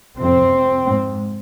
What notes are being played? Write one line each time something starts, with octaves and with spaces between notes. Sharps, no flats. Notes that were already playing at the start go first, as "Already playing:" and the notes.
F2 C3 C4
G#2